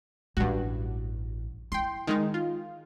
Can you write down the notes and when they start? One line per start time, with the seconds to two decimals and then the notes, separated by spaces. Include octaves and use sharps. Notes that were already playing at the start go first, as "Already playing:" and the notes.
0.37 A1 G2 F#4
1.72 E4 G5 C6
2.07 D#3 G#3 D#4
2.34 F4